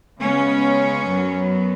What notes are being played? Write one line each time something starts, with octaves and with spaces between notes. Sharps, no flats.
C#3 G#3 B3 C#4
F#2 F#3 B3